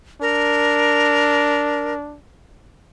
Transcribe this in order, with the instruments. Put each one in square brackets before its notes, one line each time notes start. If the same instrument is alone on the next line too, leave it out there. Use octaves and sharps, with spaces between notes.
[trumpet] D4 [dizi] A#4